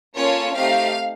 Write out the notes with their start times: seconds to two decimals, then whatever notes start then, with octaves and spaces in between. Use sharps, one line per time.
0.15 A#3 C#4 F4 A4 C#5
0.54 A3 C4 D#4 G4 F5